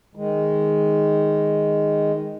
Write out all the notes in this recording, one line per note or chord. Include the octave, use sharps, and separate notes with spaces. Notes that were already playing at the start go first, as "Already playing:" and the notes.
D#3 G#3